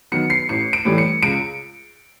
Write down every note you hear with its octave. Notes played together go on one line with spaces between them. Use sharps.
D#3 F#3 B3 C#7
C7
A1 C#7
D7
A2 E3 G3
C#7
C#2 D7